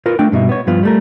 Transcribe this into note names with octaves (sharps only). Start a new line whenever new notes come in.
F4 A#4 B4
A3 D4 G5
G2 B2 D#4 E5
B3 C#5
G2 F3 B3 F4
G3 A3 A#4